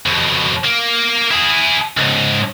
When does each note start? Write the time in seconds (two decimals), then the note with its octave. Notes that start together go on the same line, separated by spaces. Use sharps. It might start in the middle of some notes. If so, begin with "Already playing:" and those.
0.06 F2 B2
0.64 A#3
1.31 E4 G#4
1.97 C#2 G#2